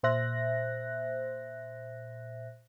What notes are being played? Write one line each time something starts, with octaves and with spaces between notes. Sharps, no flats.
A#2 C5 E5 F#6 A#6